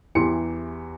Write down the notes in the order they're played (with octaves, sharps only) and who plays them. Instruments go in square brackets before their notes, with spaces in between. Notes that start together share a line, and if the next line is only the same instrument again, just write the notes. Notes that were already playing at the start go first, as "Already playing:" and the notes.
[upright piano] E2 E3 G4 C6 C#7